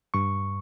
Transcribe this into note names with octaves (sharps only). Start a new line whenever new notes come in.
G2 C#6